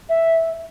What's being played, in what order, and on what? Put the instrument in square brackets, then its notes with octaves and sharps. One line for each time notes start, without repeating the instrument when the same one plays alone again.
[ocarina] E5